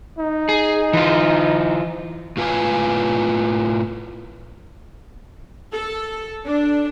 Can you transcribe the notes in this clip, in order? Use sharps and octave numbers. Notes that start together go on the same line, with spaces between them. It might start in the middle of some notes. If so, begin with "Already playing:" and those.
D#4
G#4
E3 F4
A2 F4 B4 F5 G#5
A4
D4